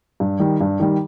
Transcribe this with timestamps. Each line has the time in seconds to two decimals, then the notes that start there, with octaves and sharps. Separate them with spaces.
0.20 G2
0.40 D#3 G3
0.61 G2
0.80 D#3 G3